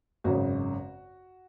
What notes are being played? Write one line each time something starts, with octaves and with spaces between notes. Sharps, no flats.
G#1 F#2 C#3 F#4